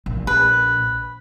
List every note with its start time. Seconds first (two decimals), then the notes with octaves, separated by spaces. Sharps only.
0.06 A#1
0.27 B4